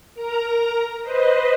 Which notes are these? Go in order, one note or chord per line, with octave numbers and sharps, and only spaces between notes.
A#4 A#5
B4 C5 D#5